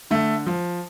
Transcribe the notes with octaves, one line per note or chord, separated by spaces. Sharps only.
D3 A3
F3